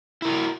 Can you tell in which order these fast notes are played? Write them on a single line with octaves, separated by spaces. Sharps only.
E4 A#4 F#4